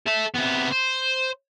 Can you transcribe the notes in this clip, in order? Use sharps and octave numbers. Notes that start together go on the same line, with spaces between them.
A4 E5
C3 B3
C5